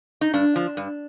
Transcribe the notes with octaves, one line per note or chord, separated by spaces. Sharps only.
D#4
G2 D4
F3
G2